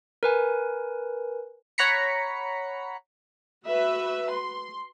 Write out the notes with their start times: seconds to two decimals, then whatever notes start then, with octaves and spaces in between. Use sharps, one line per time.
0.23 A#4 B4 G#5
1.78 C#5 F#5 A#5 B5 B6 C#7
3.66 F#4 B4 E5
4.31 C6